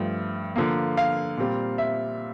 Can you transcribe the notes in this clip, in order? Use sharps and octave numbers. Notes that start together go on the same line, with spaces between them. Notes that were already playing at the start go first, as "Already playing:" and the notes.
Already playing: G2 F3 A3
D3 F3 A#3
F5
A#2 G3 C4
E5